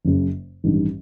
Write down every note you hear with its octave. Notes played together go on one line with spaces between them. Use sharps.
F#1 F#2 C#3
A1 G2 D#3 G3